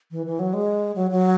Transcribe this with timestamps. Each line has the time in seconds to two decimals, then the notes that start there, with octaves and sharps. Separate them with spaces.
0.11 E3
0.26 E3
0.39 F#3
0.53 G#3
0.96 F#3
1.11 F#3